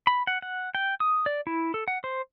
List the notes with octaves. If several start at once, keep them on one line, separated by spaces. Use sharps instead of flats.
B5
F#5
F#5
G5
D#6
D5
E4
A4
F#5
C5